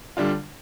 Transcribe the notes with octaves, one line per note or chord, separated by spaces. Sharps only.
D3 G3 D4 F4